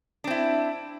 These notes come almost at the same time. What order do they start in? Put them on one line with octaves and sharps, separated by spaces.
D4 C4 E4